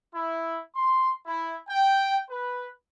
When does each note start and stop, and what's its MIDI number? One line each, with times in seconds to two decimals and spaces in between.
0.13 0.59 64
0.75 1.11 84
1.26 1.56 64
1.68 2.20 79
2.29 2.68 71